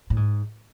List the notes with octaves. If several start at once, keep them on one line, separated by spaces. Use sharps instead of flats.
A2
G#2